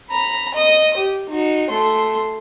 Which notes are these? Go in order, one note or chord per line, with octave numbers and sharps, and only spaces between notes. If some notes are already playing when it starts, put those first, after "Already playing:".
A#5 B5
D#5 D#6
G4
D#4 F#4
A3 C6